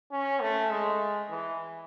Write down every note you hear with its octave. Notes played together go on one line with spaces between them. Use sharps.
C#4
A3
G#3
E3